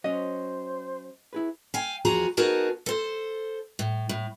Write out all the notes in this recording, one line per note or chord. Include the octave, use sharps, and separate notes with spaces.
F#3 C#4 C5 D#5
E4 G#4 B4
F5 G5 G#5
E2 F3 F#4 G#4 A#5
B3 D#4 F#4 G#4 A#4 A5
A4 C5
A2
A2